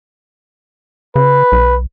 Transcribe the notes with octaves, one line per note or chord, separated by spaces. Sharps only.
C#3 B4
B1